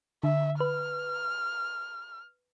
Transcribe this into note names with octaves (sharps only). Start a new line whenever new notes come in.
D3 E5
B4 F6